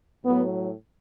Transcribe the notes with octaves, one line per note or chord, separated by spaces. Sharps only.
A2 F#3 B3